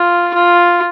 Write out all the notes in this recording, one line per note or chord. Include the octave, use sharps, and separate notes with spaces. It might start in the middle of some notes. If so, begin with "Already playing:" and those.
Already playing: F4
F4